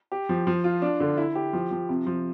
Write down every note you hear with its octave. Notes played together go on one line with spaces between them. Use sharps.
G4
F3
F3
F4
D4
D3
E4
G4
F3
F3
C3
F3